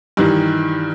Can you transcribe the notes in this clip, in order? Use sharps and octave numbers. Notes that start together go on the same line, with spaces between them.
G2 D#3 E3